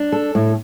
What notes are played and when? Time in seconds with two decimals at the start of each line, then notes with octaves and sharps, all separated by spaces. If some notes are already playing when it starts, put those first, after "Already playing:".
Already playing: D4
0.12 A4
0.35 A2